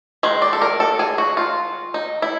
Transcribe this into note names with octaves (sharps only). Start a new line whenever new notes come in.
D#3 G#3
D5
A4
A#4
A4
G#4
F#4
F4
D#4
E4